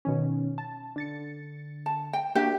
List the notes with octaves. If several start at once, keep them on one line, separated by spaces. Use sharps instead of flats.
B2 D#3 C#4
A5
D3 A6 C#7
A5
G5
A#3 D4 F#4 G4 E5